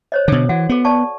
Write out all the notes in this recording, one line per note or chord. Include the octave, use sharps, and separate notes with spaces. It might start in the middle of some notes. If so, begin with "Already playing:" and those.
C5 C#5 D#5
B2 D3 A4
E3 F#4 F#5
B3 F#4 A4
D5 A5 C#6